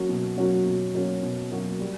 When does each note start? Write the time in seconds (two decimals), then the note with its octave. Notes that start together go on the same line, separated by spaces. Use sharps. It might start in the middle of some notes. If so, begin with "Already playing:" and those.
Already playing: F#3 A#3 C#4 F#4
0.09 B2
0.37 F#3 A#3 C#4 F#4
0.66 B2
0.94 F#3 A#3 C#4 F#4
1.23 B2
1.52 F#3 A#3 C#4 F#4
1.80 G3